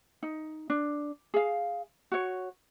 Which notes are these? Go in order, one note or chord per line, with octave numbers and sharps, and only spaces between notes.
D#4
D4
G#4 F5
F#4 C#5